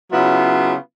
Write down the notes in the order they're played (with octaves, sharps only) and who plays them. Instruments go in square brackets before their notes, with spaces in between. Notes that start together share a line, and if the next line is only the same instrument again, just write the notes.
[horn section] C#3 F#3 B3 E4 F4